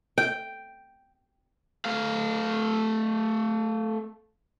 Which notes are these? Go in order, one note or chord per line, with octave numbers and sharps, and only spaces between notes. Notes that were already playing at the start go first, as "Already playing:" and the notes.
G5
A3 F5